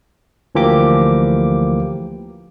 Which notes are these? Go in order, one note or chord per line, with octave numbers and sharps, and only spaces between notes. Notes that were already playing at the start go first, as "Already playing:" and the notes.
D2 E3 F3 A#3 G4 D6